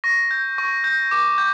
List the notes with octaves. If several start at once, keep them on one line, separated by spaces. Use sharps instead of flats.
C#6 A#6
G6
C#6
G6
D6
G6